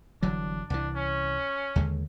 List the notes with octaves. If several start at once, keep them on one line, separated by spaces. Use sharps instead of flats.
G1 E3 F#3 D4
C2 E3 D4
C#4
D#2 D3 G#3